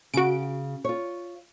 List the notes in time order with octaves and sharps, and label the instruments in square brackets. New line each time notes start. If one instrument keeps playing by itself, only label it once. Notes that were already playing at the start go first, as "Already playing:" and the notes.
[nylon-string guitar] C#3 [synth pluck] F#4 D7
[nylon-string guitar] F4 C#5